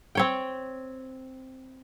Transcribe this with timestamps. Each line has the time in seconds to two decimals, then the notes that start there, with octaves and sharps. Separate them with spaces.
0.15 C4 C#5 G5